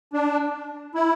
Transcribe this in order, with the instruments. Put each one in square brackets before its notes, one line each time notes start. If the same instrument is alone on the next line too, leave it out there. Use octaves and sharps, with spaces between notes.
[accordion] D4
E4